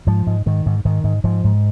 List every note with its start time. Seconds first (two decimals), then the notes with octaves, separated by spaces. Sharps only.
0.07 G#2 F3
0.27 G#2
0.46 G#2 D#3
0.66 G#2
0.85 G#2 D#3
1.04 G#2
1.24 G#2 F3
1.44 G#2